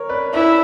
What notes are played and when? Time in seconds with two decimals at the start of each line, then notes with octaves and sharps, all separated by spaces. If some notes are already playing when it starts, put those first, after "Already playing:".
Already playing: A#4 C#5
0.09 B4 D5
0.34 E4 B4 D5